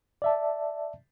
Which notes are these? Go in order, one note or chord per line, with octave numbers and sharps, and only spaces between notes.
D5 E5 A5